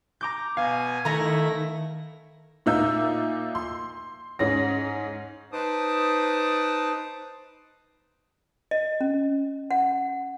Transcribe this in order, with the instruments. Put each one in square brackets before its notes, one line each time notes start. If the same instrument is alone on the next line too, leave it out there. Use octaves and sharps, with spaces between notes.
[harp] A#5 D6 G6
[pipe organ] B2 G#5 [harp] F5
[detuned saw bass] D#3 [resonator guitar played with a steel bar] A3 A#5 [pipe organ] E4 A#6
[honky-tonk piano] A#2 A#3 D#4 E5 E6 G6
C6
G#2 C#4 A#6
[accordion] D#4 B4 C5 A5 D6 D#6
[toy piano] D#5
C#4
F#5